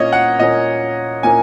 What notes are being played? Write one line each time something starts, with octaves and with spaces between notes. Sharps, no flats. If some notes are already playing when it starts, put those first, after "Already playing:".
Already playing: A#2 A#3 C#4 C#5 D#5
F#5
A#2 A#3 C#4 D#5
A#2 A#3 C#4 G#5